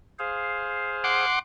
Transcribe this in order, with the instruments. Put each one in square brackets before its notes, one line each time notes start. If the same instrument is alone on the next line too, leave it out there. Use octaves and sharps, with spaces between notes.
[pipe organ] G#4 C5 F5
[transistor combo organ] F#5 C6 D6